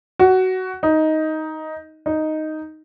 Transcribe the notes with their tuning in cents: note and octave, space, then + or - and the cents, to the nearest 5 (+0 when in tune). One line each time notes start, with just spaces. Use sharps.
F#4 +15
D#4 +10
D#4 +0